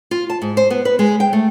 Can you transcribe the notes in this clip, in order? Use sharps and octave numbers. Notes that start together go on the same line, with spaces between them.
F4
A5
G#2
C5
B3
B4
G#3
G5
A3